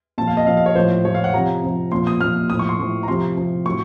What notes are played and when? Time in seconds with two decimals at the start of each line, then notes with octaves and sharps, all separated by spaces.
0.18 A#2 F3 A5
0.27 F5
0.37 D#5
0.47 A#2 F3 F5
0.57 F5
0.66 C#5
0.75 A2 F3 C5
1.05 A2 F3 C#5
1.14 F5
1.24 F#5
1.34 C3 F3 A#5
1.63 C3 F3
1.92 A#2 F3 C6
2.07 D#6
2.21 A#2 F3 F6
2.50 A2 F3 D#6
2.59 C#6
2.69 C6
2.79 A2 F3
3.03 A#5
3.08 C3 F3 C6
3.37 C3 F3
3.66 A2 F#3 C#6